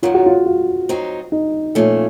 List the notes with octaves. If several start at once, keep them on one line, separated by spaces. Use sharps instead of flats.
F#2 D#3 F#3 F4
F#4
F4
F4
F#3 C4 D#4
D#4
A#2 F3 A3 C#4